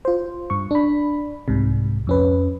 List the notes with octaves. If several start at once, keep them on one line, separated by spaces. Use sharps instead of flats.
F4 C5
G2 C#6
D4 B5
C2 G#2 C3
F2 C#4 B4